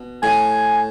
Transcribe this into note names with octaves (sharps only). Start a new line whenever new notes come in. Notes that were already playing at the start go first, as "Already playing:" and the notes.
Already playing: B2
A2 G#5